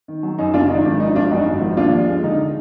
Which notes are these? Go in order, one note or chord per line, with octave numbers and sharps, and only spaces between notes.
D#3
F#3
F#2 D#4
F#1 D4 F4
D#3 D#4
G#1 D4
F3 D#4
G#1 D4 F4
F#2 D#4 F#4
G#1
F3
D#2 D4 F4
F3
G#3
D3 D#4